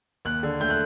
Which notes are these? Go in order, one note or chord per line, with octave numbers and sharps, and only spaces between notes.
D#2 F#6
D3
A3 G6
F#6